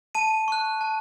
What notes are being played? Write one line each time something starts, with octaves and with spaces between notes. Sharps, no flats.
A5 D#7
C#6 F#6
A5